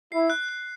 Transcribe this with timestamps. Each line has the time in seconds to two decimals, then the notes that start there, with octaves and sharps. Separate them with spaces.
0.12 E4 C7
0.30 F#6
0.49 F#6